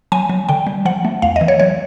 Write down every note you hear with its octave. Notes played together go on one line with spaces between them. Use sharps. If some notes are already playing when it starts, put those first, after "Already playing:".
F#3 G#5
F#3
D3 G5
G3
F3 F#5
A3
E2 F5
D#5
E3
C#5
F#3 C#5